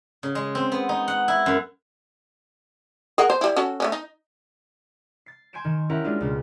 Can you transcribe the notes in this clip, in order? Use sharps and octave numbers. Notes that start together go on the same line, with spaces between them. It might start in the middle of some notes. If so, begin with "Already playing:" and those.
C#3
G#3
C4
B3
D#4
F#5
E4
F#2
G#4 A#4 F#5
C5
G3 E4
C#4 F#4 A4
A3 B3 C#4
D#4
A6 C7
G#5 C6 G6 D7 E7
D#3
C#4 E4 G4 A#4 F#5
G3 G#3 A#3 D4 F4
C#2 B2